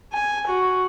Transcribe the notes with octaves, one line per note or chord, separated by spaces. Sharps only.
G#5
F#4